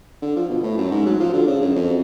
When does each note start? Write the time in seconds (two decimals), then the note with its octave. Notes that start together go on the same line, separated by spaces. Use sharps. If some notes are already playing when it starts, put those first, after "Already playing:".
0.22 D3
0.36 F3
0.49 B2
0.63 A2
0.77 F#2
0.91 G#2
1.06 F#3
1.20 F3
1.33 D3
1.47 C#3
1.61 F#2
1.75 F2